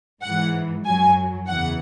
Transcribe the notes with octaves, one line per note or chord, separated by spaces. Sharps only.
G#2 E3 F#5
F#2 F#3 G#5
E2 C#3 E3 F#5